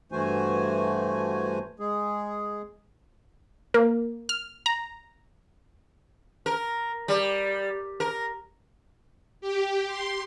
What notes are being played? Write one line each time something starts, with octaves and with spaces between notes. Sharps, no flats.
G2 E3 A3 F#4 C5 G#5
G#3 G#4
A#3
F6
A#5
A#4
G3
A#4
G4
C6